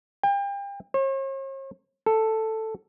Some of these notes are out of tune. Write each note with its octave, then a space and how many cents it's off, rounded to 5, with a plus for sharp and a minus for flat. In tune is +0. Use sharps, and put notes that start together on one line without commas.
G5 +35
C#5 -45
A4 +5